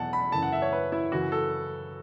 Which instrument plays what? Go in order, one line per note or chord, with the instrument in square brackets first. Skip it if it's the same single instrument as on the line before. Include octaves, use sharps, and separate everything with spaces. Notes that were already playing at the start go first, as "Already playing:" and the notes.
Already playing: [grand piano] E2 B2 F#3 F#5 A5
B5
F#2 C#3 E3 A5
F#5
E5
C#5
B4
E4
F#2 C#3 E3 F#4
A4